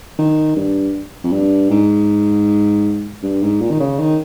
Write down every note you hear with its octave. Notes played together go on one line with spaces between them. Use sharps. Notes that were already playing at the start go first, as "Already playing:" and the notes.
D#3
G2
F2
G2
G#2
G2
G#2
A#2
D#3
C#3
D#3